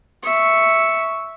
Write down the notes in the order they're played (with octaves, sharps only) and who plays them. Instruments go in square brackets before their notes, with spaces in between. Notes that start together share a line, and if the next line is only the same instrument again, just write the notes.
[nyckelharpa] E5 C#6